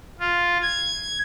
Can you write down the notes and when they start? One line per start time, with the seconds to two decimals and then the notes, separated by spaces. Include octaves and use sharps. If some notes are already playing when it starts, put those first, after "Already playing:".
0.20 F4
0.62 G#6